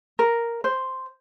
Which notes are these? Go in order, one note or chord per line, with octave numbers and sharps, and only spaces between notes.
A#4
C5